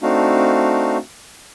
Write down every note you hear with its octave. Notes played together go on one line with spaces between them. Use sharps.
A3 C4 D4 D#4 F#4 F5